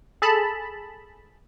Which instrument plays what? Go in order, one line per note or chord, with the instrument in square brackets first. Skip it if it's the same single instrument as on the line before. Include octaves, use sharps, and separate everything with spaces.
[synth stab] G#4 A4 A5 B5